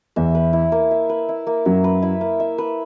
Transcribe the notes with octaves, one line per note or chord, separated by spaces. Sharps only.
E2 E3 E5
B4
E4
A#3
E5
B4
E4
A#3
F#2 F#3 E5
B4
E4
A#3
E5
B4